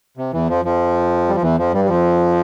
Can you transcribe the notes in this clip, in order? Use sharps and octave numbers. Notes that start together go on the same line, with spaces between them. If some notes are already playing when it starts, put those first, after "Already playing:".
C3
E2 E3
F2 F3
F2 F3
G3
F3
E2 E3
F2 F3
G2 G3
G3
F2 F3